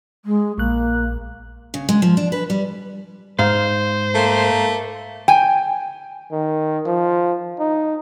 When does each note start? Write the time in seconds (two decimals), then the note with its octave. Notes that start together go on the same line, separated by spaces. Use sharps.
0.25 G#3
0.58 A#1 A#3 F#6
1.74 C#3
1.89 G#3
2.02 F3
2.17 D4
2.32 B4
2.50 G3
3.39 G#2 C5 F5
4.15 A3 A#3
5.28 G5 G#5
6.32 D#3
6.86 F3
7.59 D#4